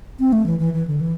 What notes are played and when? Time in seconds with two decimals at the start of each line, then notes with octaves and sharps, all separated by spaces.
0.20 C4
0.33 A3
0.46 E3
0.59 E3
0.73 E3
0.87 D3
1.01 E3